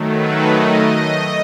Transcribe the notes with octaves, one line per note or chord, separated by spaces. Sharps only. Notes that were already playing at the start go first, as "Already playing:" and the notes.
Already playing: D#3 F#3 A3
B4
D#5